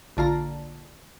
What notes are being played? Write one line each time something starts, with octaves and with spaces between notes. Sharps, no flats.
A#1 D3 F4 A#5